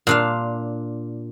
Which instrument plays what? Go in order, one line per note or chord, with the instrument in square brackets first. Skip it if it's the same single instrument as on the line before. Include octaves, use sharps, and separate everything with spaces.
[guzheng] A#2 D4 F5